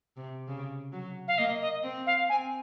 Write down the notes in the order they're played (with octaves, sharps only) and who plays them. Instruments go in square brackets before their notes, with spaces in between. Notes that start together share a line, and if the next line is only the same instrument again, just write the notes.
[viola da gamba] C3
C#3
F#3
[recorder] F5
[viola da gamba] A#3 [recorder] D#5
[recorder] D#5
[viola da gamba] C4
[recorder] F5
[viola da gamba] C4 [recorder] G#5